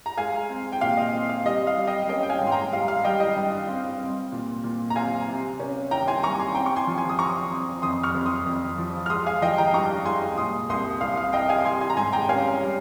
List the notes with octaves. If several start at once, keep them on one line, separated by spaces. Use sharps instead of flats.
A#5
G#3 F5 G#5
C4
G5
A#2 F5
D#5
C4
F5
G3 D#5
F5
G3
D#5 G5
C#4 D#5 G5
G5
F5 G#5
G#2
C6
G5 A#5
G3 F5
F5
G3 D#5 G5
D#5 G5
G2
C4
C4
A#2
A#2
A#5
C4 F5 G#5
C3
C#4
D#3 G5 A#5
G#5 C6
G3 A#5 C#6
G#5 C6
C4 G5 A#5
C#6
G#5 C6
F3
G#5 C6
D#6
F3 A#5 C#6
C4
F2 C6 D#6
C#6 F6
F2
C6 D#6
F2
F3
F6
G#3 C6 D#6
F5 G#5
F3 D#5 G5
G5 A#5
G2 A#5 C#6
G#3 G#5 C6
A#2 C6 D#6
C2 C6 D#6
C2 F5
F5
C2 D#5 G5
F5 G#5
G3 G#5 C6
G#5 C6
A#5
G#2 G#5 C6
G5 A#5
C#4 F5 G#5
G3